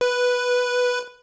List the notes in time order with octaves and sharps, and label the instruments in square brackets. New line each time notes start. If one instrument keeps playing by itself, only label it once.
[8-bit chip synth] B4